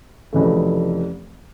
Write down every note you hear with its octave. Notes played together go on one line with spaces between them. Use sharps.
F1 F2 C#3 E3 A3